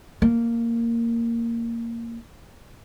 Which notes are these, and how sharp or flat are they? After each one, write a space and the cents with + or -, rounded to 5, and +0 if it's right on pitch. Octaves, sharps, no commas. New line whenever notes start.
A#3 -10